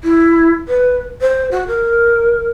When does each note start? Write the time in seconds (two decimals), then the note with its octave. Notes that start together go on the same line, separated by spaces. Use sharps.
0.03 E4
0.68 B4
1.21 C5
1.51 F#4
1.67 A#4